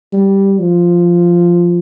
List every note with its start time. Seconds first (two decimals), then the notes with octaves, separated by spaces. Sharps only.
0.13 G3
0.59 F3